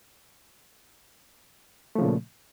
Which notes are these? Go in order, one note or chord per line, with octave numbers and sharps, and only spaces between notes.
A#2 C#3 F3 A3